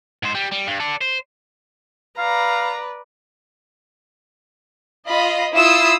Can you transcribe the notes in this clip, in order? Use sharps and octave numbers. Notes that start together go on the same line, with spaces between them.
G#2 C5
G3
G3
G2
A4 D5
C5
B4 D5 F5 A#5
F4 D#5 B5
E4 F4 D#6 E6